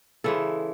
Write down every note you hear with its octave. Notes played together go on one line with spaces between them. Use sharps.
C#3 E3 G#3 A4